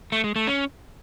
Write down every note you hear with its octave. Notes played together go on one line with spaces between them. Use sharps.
A3
G#3
A3
C#4